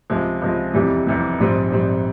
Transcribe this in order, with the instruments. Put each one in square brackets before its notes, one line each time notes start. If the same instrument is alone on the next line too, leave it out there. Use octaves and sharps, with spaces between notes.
[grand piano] C#2 C3 F3 G#3
C#2 C3 F3 G#3
F1 E2 C3 E3 G3
F1 E2 C3 E3 G3
A#1 G#2 G3 C4
A#1 G#2 G3 C4